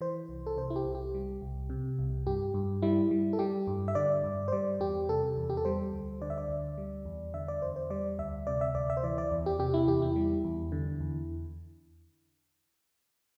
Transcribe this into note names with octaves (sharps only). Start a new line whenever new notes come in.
E3 C5
C2
A4
C3 C5
E4
G4
C2
G4
G3
C2
C3
C2
G2 G4
G2
G3 E4
G3
A4
G3 G4
G2
E5
D3 D5
G2
C5
G3 D5
E2 G4
C3 A4
E2
G4
A4
G3 C5
D2
D3 D5
E5
D5
D2
G3
E2
D3 E5
D5
E2 C5
C5
G3 D5
D2 E5
C3 D5
E5
D2 D5
E5
C5
E3 D5
D5
E2
G4
C3 G4
E4
E2 G4
E4
G3
E2
D3
E2